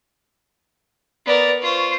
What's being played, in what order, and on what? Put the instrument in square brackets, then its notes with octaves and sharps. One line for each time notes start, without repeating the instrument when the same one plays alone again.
[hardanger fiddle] B3 A#4 [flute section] D5
[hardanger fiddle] F4 C5 [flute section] C#6